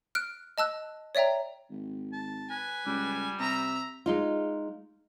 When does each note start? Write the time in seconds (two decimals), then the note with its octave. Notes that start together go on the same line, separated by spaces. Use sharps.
0.15 F6 F#6 D7
0.58 D#5 A5 E6 F#6
1.15 C#5 D5 E5 G5 A#5
1.70 G#1
2.13 A5
2.50 B4 G#5
2.86 C#2 G3
3.40 C3 E5 A#5
4.06 G#3 D#4 F4